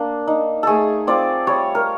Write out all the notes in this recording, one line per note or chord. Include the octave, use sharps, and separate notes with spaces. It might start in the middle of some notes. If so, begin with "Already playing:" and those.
Already playing: A#3 D4
D#4
A3 G#4 A4
C4 F4 D5
G3 C#5
A#4